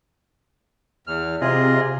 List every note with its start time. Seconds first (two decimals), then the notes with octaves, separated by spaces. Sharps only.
1.07 E2 F6
1.41 C3 F4 G#4 D#5